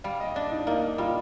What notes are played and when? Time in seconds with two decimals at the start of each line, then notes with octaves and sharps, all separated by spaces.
0.04 G3 F5
0.20 D#5
0.36 D4 D5
0.51 D#4
0.67 A#3 D#4
0.98 G3 F4